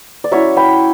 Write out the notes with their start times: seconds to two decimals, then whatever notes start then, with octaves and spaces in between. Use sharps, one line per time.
0.24 D5
0.32 F#3 C#4 E4 C#5 E5
0.57 G5 B5